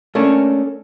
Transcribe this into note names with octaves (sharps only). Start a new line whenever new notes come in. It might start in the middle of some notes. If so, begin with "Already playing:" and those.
A3 A#3 C#4 D4